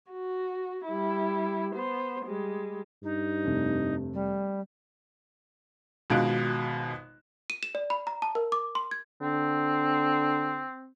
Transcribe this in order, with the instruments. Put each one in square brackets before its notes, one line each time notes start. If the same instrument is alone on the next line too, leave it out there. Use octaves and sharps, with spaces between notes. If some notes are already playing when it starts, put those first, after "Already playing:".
[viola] F#4
G3 E4
B3 C5
G3 G#3
[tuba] G2 [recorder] D#4
[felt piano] F1 C3
[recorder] G3
[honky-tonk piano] G#1 B2 G#3 F4 F#6 D7
[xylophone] D#7
E7
D5
B5
A#5
A5
A#4
D6
C6
G#6
[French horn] D3 [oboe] C4